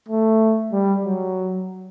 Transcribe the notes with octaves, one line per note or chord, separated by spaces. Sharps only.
A3
G3
F#3